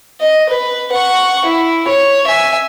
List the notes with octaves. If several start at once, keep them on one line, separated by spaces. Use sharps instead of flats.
D#5
B4
F#5 C#6
E4
C#5
E5 G#5